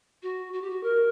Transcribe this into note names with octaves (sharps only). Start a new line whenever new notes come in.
F#4
F#4
G4
F#4
A#4